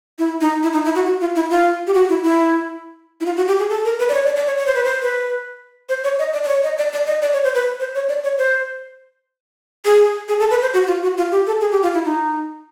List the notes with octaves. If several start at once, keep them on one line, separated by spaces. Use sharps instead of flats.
E4
D#4
E4
D#4
E4
F#4
F#4
F4
E4
F4
G4
F#4
E4
E4
E4
F4
F#4
G4
G#4
A4
A#4
B4
D5
C#5
D5
D5
C#5
C#5
C5
B4
C5
B4
C5
C#5
D#5
D5
D5
C#5
D#5
D5
D5
D#5
D5
C#5
C5
B4
C5
C#5
D5
C#5
C5
G#4
G#4
A4
B4
C5
F#4
F4
F#4
F4
G4
A4
G#4
G4
F4
E4
D#4